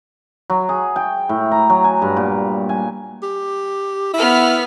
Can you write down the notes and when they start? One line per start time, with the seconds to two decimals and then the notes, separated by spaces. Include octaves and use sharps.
0.50 F#3
0.69 G#4
0.96 G5
1.29 A2
1.52 A#5
1.70 F#3
1.84 G#5
2.02 G2
2.16 A#2
2.69 G#5
3.23 G4
4.13 B3 E4 F6 B6